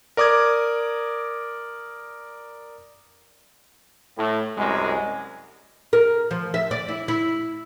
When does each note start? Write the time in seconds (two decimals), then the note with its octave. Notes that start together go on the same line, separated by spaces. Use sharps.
0.17 A#4 D5 D6 D#6 G#6
4.18 A2
4.57 C2 F#2 G#3
5.93 A#4
6.31 F3
6.54 E5
6.71 D5
6.88 E4
7.08 E4